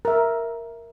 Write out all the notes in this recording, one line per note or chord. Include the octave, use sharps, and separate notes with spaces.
A#4 E5